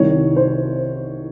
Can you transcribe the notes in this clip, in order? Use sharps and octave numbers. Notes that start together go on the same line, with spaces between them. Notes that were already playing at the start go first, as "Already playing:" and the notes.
Already playing: C2 C3 D#3 C#5
C5